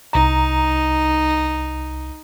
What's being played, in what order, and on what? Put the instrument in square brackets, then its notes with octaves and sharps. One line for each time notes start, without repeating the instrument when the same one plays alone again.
[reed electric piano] C2 A#5 [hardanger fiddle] D#4